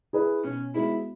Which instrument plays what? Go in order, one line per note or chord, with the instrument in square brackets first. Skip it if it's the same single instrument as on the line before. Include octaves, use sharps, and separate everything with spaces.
[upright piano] E4 G#4 B4
[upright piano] B2 [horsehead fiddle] C#4
[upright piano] G#3 B3 F#4 [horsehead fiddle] E4